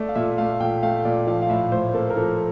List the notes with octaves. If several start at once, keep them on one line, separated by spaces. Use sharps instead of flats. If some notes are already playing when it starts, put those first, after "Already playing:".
Already playing: A3 D5
F5
A#2 E5
A3 F5
A#2 G5
A3 F5
A#2 D5
F3 F5
F5
A2 E5
A2 C5
A#3 A4
A#4
F3 A4